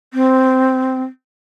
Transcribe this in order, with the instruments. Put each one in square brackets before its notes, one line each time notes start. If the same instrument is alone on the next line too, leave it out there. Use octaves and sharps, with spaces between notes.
[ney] C4